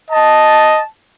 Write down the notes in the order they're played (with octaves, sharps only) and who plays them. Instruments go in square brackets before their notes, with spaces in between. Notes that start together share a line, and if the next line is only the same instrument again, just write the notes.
[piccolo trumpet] D#5 [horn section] A5